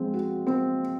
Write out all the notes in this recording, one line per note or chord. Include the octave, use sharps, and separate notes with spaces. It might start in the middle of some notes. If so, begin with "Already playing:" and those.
Already playing: F3 G#3 C4
F#4
C4